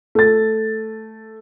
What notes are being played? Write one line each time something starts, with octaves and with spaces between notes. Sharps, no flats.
A3 A6